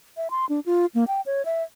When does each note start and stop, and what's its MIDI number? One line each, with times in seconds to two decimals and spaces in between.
0.17 0.28 76
0.31 0.46 84
0.49 0.60 62
0.66 0.86 65
0.95 1.04 58
1.08 1.21 79
1.26 1.45 73
1.45 1.63 76